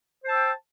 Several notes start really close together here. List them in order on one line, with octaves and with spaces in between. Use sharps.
C5 A5 E6 G5